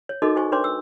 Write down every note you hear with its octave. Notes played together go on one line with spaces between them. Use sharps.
C#5
D#4 F#4 A4 A#4 D#5 D6
D#4 F#4 C5 G#5 C#6
D4 B4 C#5 C6 D6
E6